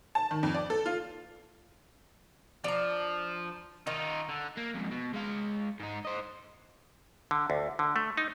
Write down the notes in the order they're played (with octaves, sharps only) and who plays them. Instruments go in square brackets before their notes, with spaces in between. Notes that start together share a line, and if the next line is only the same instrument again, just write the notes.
[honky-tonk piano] A5
D#3
F2
D5
A4
F4
[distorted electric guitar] F3 [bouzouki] D4 A#5
[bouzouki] D#3 D#5 [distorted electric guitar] D#4 F4
[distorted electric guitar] D3
[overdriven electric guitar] A#3
F2 G#2
B2
G#3 F5
G#2 D#4
C5 D#5
[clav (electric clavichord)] D3
D2
D3
A3
D#4